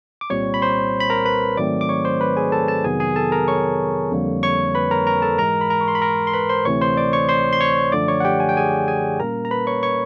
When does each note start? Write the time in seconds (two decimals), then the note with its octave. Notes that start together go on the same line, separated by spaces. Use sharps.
0.21 D6
0.30 C2 A#2 G3 C4 C#5 C#6
0.54 B5
0.62 C5 C6
1.00 B5
1.10 A#4 A#5
1.25 B4 B5
1.57 G#2 D#3 F#3 A3 C4 D5 D6
1.81 D6
1.89 C#5 C#6
2.05 C5 C6
2.21 B4 B5
2.37 G#4 G#5
2.52 A4 A5
2.68 A4 A5
2.84 F2 C3 D#3 F#3 B3 G#4 G#5
3.00 G#4 G#5
3.16 A4 A5
3.32 A#4 A#5
3.48 C#5 C#6
4.12 F2 D3 G3 A#3
4.43 C#5 C#6
4.75 B4 B5
4.91 A#4 A#5
5.07 A#4 A#5
5.22 A4 A5
5.38 G#2 E3 G#3 A#4 A#5
5.61 B5
5.70 A#4 A#5
5.81 C#6
5.88 C6
5.95 B5
6.02 A#4 A#5
6.27 C6
6.33 B4 B5
6.49 C5 C6
6.65 D2 C3 E3 A3 C4 C#5 C#6
6.81 C5 C6
6.97 D5 D6
7.13 C#5 C#6
7.29 C5 C6
7.53 C6
7.60 C#5 C#6
7.92 F#2 D3 F3 A3 D5 D6
8.08 C#5 C#6
8.20 F#5
8.25 G4 G5
8.40 G#5
8.49 G5
8.57 G#4 G#5
8.88 G#4 G#5
9.20 A#2 G3 A#3 C#4 A#4 A#5
9.45 A#5
9.51 B4 B5
9.67 C#5 C#6
9.83 C#5 C#6